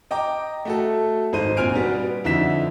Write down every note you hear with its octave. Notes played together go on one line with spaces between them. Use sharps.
D#5 G5 A#5 D6
A3 F#4 A4
G#1 D#4 C5 D#7
G1 A#2 C4 G#5 F6 D7
G3 B3 F#4
F2 D3 D#4 E4 B6 E7